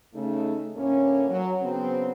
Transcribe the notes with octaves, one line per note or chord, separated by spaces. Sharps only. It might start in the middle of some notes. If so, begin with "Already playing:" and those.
C#3 A3 D#4
D2 A2 A#3 C#4
F#3
C#3 F#3 B3 C4